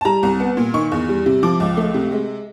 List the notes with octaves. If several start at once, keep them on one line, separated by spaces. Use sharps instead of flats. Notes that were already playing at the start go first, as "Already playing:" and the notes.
A5
G3 A#5
C2
B3
A#2
D#3 C#6
E2
G3
C3
F3 D6
C#2
A3
C3
G#3